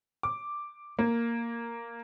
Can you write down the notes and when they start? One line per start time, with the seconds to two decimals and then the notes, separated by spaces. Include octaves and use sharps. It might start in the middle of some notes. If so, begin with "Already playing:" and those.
0.23 D6
0.99 A#3